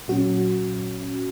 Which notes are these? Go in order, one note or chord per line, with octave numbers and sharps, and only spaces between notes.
A#2 F#3 C#4 F#4